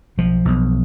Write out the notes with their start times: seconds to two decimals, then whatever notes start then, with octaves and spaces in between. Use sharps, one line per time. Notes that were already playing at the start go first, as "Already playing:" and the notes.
0.18 B1 F3
0.45 B1